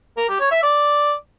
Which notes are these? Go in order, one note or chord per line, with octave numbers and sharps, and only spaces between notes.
A#4
G4
C#5
E5
D5